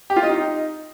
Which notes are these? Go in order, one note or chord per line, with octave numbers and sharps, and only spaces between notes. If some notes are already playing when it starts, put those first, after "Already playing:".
G4
F4
D#5
D#4